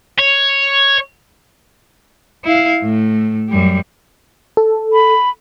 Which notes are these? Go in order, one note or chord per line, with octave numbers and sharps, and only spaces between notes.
C#5
E4 F5
A2 A3
F#2 G3
A4
B5